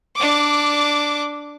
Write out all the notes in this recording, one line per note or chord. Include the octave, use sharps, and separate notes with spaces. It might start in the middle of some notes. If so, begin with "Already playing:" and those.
D4 D6